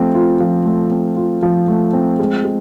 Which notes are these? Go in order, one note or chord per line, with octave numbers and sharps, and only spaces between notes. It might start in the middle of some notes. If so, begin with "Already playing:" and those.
Already playing: F3 A3 C4
F4
F3
A3
C4
F4
F3
A3
C4
G#3
G#3